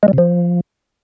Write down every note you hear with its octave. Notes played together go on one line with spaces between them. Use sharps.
G#3
G3
C3
F3